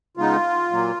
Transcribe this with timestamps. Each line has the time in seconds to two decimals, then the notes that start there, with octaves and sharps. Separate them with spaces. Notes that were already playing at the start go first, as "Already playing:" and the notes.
0.17 C#3 G#3 B3 D#4 F4
0.72 A#2 F#3 A#3